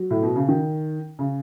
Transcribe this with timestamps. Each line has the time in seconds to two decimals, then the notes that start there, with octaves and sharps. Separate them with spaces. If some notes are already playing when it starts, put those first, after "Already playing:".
Already playing: F#3
0.10 A2
0.23 B2
0.36 C#3
0.48 D#3
1.19 C#3